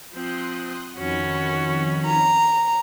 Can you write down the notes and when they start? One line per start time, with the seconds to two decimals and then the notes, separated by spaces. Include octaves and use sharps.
0.14 F3 C4 C6 D#6 F#6
0.96 F2 D#3 C#4 F#4 B5
2.04 A#5